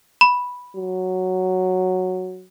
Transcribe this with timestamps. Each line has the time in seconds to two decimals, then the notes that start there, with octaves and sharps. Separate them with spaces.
0.21 B5
0.77 F#3